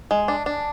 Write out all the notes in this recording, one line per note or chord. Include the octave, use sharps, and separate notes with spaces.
G#3
D4
D4